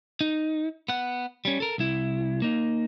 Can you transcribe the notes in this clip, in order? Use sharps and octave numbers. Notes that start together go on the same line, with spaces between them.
D#4
B3 F#5
G3 C#4
A4 A#4
C2 E4
A#3 D#4